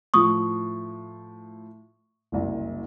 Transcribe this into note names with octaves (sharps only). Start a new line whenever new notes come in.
A2 F3 C#6 D#6
F#1 C2